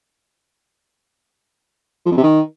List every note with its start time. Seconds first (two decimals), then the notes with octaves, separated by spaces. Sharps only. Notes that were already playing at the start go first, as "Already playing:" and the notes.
2.06 F3
2.11 F2
2.17 C3
2.23 D#3